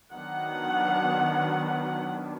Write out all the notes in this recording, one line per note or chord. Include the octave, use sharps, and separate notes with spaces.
D#3 F#3 B3 D4 F#5